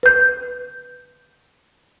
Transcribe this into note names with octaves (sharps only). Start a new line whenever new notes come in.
B4 G6